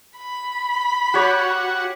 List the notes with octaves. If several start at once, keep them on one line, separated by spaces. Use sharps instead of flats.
B5
F#4 G4 C#5